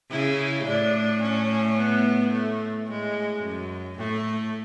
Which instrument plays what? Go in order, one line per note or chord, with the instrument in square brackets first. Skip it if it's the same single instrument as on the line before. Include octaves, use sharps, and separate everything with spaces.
[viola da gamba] C#3 [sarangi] E4
[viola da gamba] A2 [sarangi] D4
[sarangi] C#4
B3
A3
[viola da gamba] A2 [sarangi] G#3
[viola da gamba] F#2
[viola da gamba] A2 [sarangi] A3